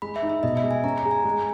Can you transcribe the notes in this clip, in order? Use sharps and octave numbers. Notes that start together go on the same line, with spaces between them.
G#3 B5
E5
D#4
E5
B2 D#5
E5
G#3
G#5
C#4 A#5
A#5
G#4
G#5
G#3